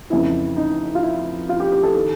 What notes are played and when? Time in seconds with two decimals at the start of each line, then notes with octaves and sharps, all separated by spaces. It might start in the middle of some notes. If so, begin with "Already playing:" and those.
0.10 F2 C#3 E3 E4
0.56 D#4
0.95 F4
1.03 E4
1.49 F4
1.60 G4
1.72 G4
1.83 A4
1.95 D#3 A4